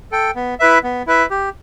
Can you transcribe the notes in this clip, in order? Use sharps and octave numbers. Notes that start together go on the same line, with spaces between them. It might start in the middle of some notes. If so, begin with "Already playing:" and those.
A4 G5
B3
E4 B4 E5
B3
E4 B4 E5
G4